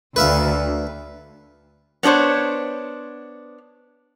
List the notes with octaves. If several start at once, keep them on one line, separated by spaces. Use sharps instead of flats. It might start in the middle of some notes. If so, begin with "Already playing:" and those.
D2 B4 E5 F5
B3 C#4 D4 C5 C#5